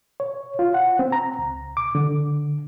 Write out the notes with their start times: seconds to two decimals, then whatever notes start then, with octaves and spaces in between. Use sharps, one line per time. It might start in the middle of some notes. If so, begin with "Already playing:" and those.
0.20 C#5
0.59 F4
0.74 F#5
0.99 C4
1.12 A#5
1.39 C#2
1.77 D6
1.95 D3